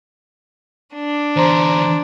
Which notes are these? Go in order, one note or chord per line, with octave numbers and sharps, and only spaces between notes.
D4
E2 D3 C5 A#5 C6